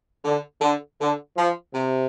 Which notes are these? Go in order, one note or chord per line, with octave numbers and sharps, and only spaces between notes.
D3
D3
D3
F3
C3